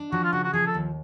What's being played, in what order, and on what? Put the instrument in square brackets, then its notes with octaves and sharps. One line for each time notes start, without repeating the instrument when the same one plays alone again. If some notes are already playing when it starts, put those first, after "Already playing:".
Already playing: [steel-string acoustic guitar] D4
[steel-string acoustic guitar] F3 [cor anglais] F#4
[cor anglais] F4
[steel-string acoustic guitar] C#3 [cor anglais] F#4
[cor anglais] F#4
[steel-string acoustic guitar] F3 [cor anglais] G#4
[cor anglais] A4
[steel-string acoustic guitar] D#2